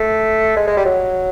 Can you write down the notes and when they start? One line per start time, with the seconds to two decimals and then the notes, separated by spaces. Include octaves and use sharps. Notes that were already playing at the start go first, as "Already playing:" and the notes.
Already playing: A3
0.56 G#3
0.67 G#3
0.77 G3
0.85 F#3